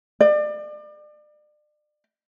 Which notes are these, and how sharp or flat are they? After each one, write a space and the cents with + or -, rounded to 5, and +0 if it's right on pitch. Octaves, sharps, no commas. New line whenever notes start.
D5 +35